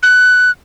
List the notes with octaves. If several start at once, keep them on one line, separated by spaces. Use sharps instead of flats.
F#6